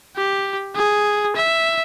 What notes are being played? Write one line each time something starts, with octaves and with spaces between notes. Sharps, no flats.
G4
G#4
E5